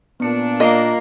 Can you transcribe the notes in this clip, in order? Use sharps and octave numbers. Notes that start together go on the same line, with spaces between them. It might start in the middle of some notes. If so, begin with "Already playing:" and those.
A#2 B3 D4 C#7
A#3 F4 D#5 A#5